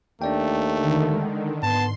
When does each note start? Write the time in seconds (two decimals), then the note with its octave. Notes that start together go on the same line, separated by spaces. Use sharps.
0.22 D#2 A3 D4 D5 G5
0.78 D3 D#3
1.11 G#3
1.63 G#2 B3 A5 C6